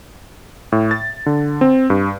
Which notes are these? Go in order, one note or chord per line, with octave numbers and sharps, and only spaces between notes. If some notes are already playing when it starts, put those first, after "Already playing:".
A2
A6
D3
C4
G2